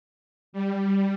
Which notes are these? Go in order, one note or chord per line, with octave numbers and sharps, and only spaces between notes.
G3